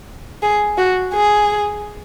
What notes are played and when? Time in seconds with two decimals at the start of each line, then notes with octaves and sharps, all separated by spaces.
0.43 G#4
0.78 F#4
1.14 G#4